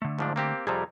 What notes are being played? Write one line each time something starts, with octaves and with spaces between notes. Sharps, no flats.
D3 A3
G#2 F3 D4
A#3 C4 G4
F2 C3 G3 G#4 A5 A#5